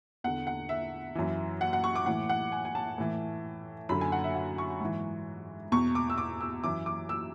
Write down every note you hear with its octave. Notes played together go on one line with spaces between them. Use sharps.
E2 D3 F#5
F#5
E5
F#2 E3
F#5
F#5
C#6
D6
A2 E3 F#5
F#5
G#5
G#5
A5
A2 E3
F#2 D3 B5
G#5
F#5
E5
F#5
C#6
G#2 E3 C#6
E2 B2 C#6
D6
E6
D6
E6
F#2 E3 D6
D6
E6